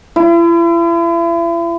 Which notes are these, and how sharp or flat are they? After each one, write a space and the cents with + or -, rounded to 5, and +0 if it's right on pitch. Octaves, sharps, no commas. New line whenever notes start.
E4 +40